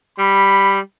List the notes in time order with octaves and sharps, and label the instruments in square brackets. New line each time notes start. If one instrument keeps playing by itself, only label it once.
[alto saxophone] G3 [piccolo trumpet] B5